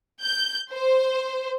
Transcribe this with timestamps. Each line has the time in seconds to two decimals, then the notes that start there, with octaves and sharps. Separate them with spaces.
0.23 G6
0.73 C5